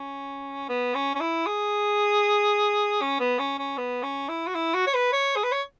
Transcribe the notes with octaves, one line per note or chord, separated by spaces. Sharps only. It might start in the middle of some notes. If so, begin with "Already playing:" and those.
Already playing: C#4
B3
C#4
C#4
E4
G#4
C#4
B3
C#4
C#4
B3
C#4
E4
F#4
E4
F#4
C#5
B4
C#5
G#4
B4
C#5